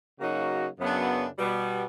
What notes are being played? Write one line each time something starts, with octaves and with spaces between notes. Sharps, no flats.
C#3 F#3 A#3 D#4 F#4
F#2 C#3 F#3 B3 D4
B2 G3 B3